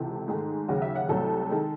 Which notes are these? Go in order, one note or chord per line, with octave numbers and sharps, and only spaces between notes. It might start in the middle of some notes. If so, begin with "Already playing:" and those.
Already playing: C#2 C3 E3 A4
G#2 D#3 A3 G#4
D#2 C#3 F#3 F#4
E5
F#5
C2 C3 F#3 A3 A4
D#3 G#3